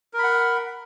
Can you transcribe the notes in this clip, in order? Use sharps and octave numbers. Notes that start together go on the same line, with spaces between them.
A#4 F#5 B5